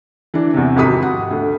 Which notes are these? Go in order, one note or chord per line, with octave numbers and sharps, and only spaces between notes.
E3 D4
E2 C3
G#1 F2 F#4 G4 D#6 B6
F#5
D2